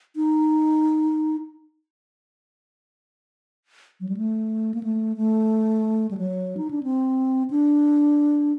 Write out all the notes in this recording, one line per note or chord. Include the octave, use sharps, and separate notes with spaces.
D#4
F#3
G3
A3
A#3
A3
A3
G3
F#3
D#4
D4
C4
D4